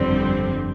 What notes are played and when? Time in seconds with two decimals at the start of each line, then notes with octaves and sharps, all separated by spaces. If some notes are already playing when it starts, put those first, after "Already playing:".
Already playing: G1 F2 D3 G3 C4